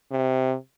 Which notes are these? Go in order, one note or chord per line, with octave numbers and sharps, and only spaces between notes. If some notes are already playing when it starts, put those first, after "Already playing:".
C3